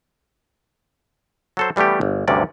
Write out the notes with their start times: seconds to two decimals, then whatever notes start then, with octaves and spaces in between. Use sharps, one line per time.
1.57 F#3 A4 C5
1.76 E3 G3 A3 B3 G4
2.01 G1
2.28 D2 G2 C3 C#4 D5